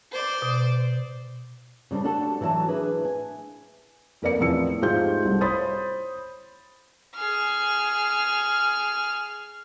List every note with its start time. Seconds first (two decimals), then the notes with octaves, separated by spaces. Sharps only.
0.11 C5 D5
0.42 B2
1.91 C#3 G3 C4 D4
2.04 D4 F#4 G4 A4
2.41 E3 F#3 C#5 E5 A5
2.68 D4 G#4 B4
3.00 E5 G#5
4.22 F2 A#3 B4 D5 C#7
4.39 E2 A2 F3 C4 E6 C#7
4.82 G#2 A3 F4 G4 C5 G6
5.25 C2
5.41 C5 C#5 B5 C6 D#6 A6
7.16 G#4 F6